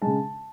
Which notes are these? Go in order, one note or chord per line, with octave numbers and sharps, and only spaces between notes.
C#3 G#3 A5